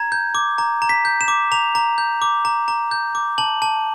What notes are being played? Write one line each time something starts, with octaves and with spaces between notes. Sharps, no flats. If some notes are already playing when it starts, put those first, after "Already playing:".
Already playing: A#5 G#6
G6
D6
A#5
A#5
B6
G6
E7
D6
A#5 F7
A#5
G6
D6
A#5
A#5
G6
D6
A5 F#7
A5